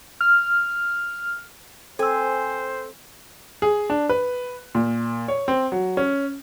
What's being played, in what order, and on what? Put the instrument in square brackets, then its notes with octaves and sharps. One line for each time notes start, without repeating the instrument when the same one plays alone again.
[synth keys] F6
[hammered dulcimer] C4 [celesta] A4 E6 [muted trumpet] C5 [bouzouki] G#5
[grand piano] G#4
D4
B4
A#2
C#5
C4
F#3
C#4